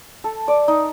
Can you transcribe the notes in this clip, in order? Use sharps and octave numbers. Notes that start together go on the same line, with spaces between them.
A4
D5
D#4